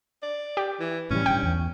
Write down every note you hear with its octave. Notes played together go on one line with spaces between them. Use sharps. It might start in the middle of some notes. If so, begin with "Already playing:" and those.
D5
G4
E3
A2 E3 G3 C#4
D1 G2 G5
E2